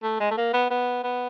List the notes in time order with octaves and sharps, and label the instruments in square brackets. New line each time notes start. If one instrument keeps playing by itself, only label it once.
[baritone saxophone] A3
G#3
A3
A#3
B3
B3
B3